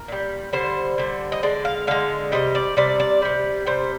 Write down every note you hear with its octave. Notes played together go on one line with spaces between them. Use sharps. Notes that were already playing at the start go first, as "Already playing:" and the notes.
Already playing: A#4
A#2 G3
D3 G3 C5
D3 G3
D#5
D3 G#3 D5
F5
D3 G#3 F5
C3 G3 D#5
D5
C3 G3 D5
D5
C3 G3
C3 G3 C5